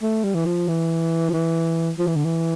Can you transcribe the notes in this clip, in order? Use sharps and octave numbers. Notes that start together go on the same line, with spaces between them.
A3
G3
E3
F3
E3
F3
E3
F3
E3
D3
E3